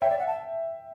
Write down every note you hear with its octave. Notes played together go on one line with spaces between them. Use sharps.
C#5 E5 G5
D5
F#5
A5